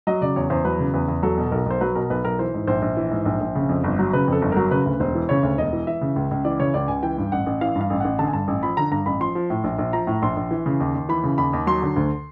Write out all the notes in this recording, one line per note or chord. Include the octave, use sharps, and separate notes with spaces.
F#3 D#5
C#3 D5
E2 C#5
E2 C5
F#3 B4
C#3
E2 B4
E2
F#3 A4
B2
B1 A#4
B1 C5
F#3 B4
B2 A#4
B1 B4
B1 A#4
E3 C5
G#2
A#1 C5
A#1
E3
G#2
A#1
A#1
C#3
F2
G1
F#3
C#3 B4
F2 A4
G1
F#3 A#4
C#3 B4
D2
E1 C5
E3
C#3 C#5
D2
E1 D#5
E3
E3 E5
C#3
C#2
C#2
E3 D5
C#3 C#5
C#2 D5
C#2 G#5
E3 G5
G2
A1 F#5
A1
E3 F5
G2
F5
A1
A1 F#5
D3 A5
G#5
G2 A5
A1
F3 B5
D3 A#5
G2 A#5
A1 B5
F3 C6
F3
A2
A#1
A#1
F3 A#5
A2
A#1 C6
A#1
E3
C#3
D#2
D#2
E3 B5
C#3
D#2 B5
D#2
F#3 C6
D3
D2